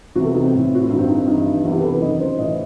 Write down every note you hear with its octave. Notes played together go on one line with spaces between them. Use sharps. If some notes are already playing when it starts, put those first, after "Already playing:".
E2 C3 E3 F#4
A4
D#4
C4
A2 E3
F#4
E4
G2 D#3 D#4
C4
D#4
C4
G2 E3 D#4
E2 C3 D#3 E4
G4
B4
A4
B4
F#2 D#3 D#5
C5
A2 E3 D#5